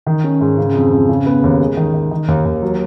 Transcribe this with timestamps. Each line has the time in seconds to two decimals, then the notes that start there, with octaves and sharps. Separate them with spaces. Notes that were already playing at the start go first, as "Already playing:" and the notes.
0.07 D#3
0.24 C#4
0.41 G#2
0.58 C#3
0.75 F2
0.92 F2
1.09 C#3
1.26 B3
1.44 D#2
1.60 G#3
1.77 D#3
1.94 D#3
2.11 D#3
2.28 D#2
2.45 D#2
2.62 F#3